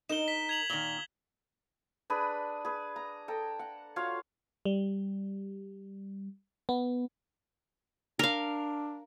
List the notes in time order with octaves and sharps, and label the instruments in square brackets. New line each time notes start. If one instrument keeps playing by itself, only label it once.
[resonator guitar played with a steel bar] D#4 A#4 [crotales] E7 G7
[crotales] B6
G#6 F7 F#7
[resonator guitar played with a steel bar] A#2 D#3 [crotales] G7
[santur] D4 G#4 B4 B5
G#4 B4
A#5
A4 G5 A#5
F#5
F4 F#4 C#5 F5
[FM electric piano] G3
B3
[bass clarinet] D4 [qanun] A#4 F5